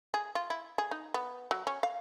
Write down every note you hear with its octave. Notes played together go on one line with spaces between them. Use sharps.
G#4
F4
E4
G#4
D#4
B3
F#3
C#4
F5